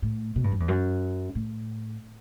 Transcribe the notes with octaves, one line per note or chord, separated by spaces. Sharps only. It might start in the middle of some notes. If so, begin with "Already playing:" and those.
A2
B2
G2
F#2
E2
F#2
A2